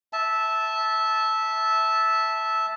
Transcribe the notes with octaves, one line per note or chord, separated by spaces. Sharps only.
E5 A5